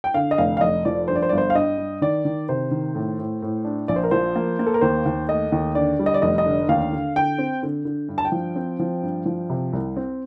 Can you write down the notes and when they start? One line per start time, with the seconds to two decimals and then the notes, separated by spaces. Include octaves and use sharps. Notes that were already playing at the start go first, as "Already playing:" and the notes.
0.04 G5
0.14 D3 F5
0.31 D#5
0.38 F1 F5
0.57 F5
0.61 F1 D#5
0.85 F3 D5
1.08 G2 C5
1.15 D5
1.22 C5
1.29 D5
1.32 G1
1.38 C5
1.50 F5
1.55 G2 D#5
1.78 G2
2.02 D#3 D5
2.25 D#3
2.49 C3 C5
2.71 D#3
2.95 A2
3.19 A2
3.42 A2
3.65 D4
3.88 A#1 D5
3.96 C5
4.04 A#4
4.11 F3 C5
4.36 A#3
4.59 A#3
4.67 A4
4.74 A#4
4.81 D#2 C5
5.06 D#2
5.28 A3 D#5
5.52 D#2
5.75 D3 D5
5.99 G3
6.06 D#5
6.14 D5
6.22 F1 D#5
6.38 D#5
6.46 D3
6.69 D#2 F5
6.93 D3
7.16 D3 G5
7.38 C4
7.63 D3
7.85 D3
8.09 G2
8.18 A5
8.25 G5
8.32 F3
8.56 C4
8.79 F3
9.02 G2
9.26 F3
9.50 C3
9.73 C2
9.96 C4